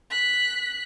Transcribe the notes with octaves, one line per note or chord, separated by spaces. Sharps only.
F#6 B6